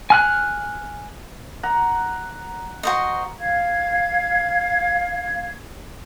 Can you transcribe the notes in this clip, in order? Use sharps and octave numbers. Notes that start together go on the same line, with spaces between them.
G#5 F6 F#6
F#5 A#5
F#4 C5 D#5
F5 G#6